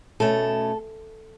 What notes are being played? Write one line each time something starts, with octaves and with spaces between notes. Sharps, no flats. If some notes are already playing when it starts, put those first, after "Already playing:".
B2 A3 C#4 A4